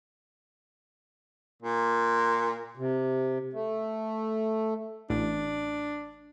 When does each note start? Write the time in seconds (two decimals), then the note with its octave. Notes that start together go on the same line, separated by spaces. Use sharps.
1.62 A#2
2.77 C3
3.53 A3
5.10 A1 D4